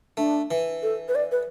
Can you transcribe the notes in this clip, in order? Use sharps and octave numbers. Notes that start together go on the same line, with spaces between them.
A3 D4
E3
A4
B4
D5
B4